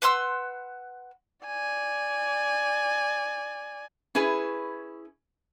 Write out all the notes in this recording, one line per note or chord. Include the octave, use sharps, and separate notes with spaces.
B4 F#5 C6 E6
D5 G#5
C#4 E4 G#4 B4